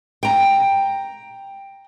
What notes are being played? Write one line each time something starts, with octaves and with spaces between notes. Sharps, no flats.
G5 A#5